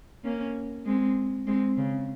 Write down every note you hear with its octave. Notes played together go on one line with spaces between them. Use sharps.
A#3 C#4
G#3 C4
G#3 C4
C#3